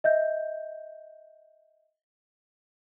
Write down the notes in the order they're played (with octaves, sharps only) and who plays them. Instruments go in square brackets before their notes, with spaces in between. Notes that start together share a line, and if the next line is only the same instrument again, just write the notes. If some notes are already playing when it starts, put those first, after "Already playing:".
[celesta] D#5 E5 G6